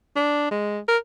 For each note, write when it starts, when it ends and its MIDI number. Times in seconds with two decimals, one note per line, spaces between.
0.16 0.50 62
0.51 0.79 56
0.88 0.97 70